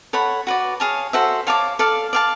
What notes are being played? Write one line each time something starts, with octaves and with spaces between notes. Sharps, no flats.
A4 C#5 F#5 B5
F#4 B4 D5
G#4 C#5 F5 A5
F#4 A4 C5 E5
C#5 F5 A5 D6
A4 D5 F5
D5 F5 A5